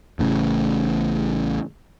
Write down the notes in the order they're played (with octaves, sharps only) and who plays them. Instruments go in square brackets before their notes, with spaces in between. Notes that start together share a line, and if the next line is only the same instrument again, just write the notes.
[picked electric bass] A1 A2 C#3